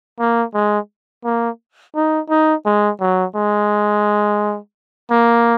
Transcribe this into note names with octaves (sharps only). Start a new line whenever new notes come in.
A#3
G#3
A#3
D#4
D#4
G#3
F#3
G#3
A#3